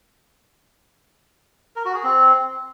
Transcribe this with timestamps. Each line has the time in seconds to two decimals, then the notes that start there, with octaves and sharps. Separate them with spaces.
1.76 A#4
1.85 F#4
1.95 G#4
2.04 C4